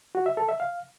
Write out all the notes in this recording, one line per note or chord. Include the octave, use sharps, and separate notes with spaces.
F#4
E5
A4
E5
F5